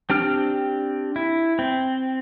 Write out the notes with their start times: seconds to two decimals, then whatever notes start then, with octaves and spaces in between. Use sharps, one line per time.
0.10 C4 D4 G4 F6
1.16 E4
1.59 C4